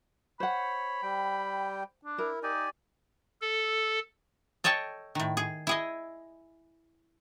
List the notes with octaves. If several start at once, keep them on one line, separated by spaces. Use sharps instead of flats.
C5 C#5 F#5 B5
G3 G5
D4
E4 A#4
D#4 G4 D5 G#5
A4
A4 C#5 D#5 G5 A5
A2 D#3
G#4
E4 G#4 D#5